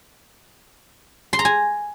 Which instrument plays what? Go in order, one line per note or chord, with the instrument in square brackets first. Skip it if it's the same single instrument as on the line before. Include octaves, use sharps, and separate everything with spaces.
[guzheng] C6
A#5
G#5